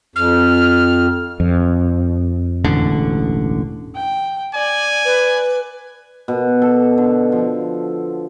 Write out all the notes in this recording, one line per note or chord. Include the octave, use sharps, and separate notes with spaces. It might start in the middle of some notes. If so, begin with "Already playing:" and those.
F2 F6
F2
E1 A1 D3
G5
D5 G#5
B4
B2
A4
D3
F3